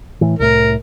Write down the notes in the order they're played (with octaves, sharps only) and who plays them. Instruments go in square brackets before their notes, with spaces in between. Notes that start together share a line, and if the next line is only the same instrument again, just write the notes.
[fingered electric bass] A2 E3
[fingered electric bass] C2 A2 [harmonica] A#4